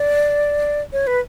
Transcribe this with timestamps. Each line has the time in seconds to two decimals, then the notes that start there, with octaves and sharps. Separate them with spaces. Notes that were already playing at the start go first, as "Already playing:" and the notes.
Already playing: D5
0.93 C#5
1.07 B4